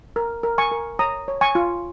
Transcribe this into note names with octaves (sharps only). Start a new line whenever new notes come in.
A#4
A#4
G#5 C#6
A#4
C#5 A#5 D#6
C#5
G#5 C#6
F4